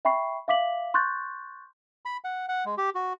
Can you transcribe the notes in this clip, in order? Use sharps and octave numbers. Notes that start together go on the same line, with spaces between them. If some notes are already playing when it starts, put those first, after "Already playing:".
E5 G5 B5 C#6 C7
E5 F5 D6 B6 F#7
C6 C#6 F#6 G6 A6
B5
F#5
F#5
G#3
G4
F#4